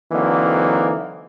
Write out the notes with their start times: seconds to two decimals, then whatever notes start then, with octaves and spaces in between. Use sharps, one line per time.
0.12 D3 E3 F#3 A#3 C4 D#4